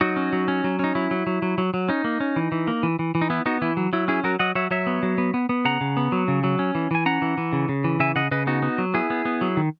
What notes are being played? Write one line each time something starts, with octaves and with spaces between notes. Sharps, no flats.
F#3 D#4 F#4
C#4
F#3
C#4
F#3
C#4 D#4
F#3 E4
F#3
F#3
F#3
F#3
F#3
C#4 D#4
A#3
C#4
E3
E3
A#3
E3
E3
E3
D#4
B3 E4
B3 D#4 F#4
E3 E4
F#3
F#3 E4
C#4 E4 G#4
F#3 F#4 A#4
F#3 D#5 F#5
F#3 C#5 E5
F#3 C#5 E5
B3
F#3
B3
B3
B3
C#3 F#5 A#5
C#3
B3
F#3
C#3
F#3
C#4
E3
E3 G#5
C#4 F#5 A#5
E3
E3
C#3
C#3
E3
C#3 E5 G#5
C#3 D#5 F#5
C#3 B4 D#5
B3 D#4 F#4
B3
F#3
B3 E4 G#4
B3
B3
F#3
D#3